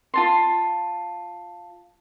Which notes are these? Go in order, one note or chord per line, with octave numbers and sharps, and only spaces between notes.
F4 A5 C6